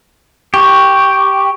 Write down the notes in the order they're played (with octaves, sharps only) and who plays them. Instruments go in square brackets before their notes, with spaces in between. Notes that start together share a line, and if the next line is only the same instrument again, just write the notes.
[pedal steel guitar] G4 [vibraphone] C#6